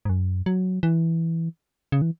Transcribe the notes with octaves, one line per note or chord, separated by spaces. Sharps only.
G#2
F#2
F#3
E3
C#3
E3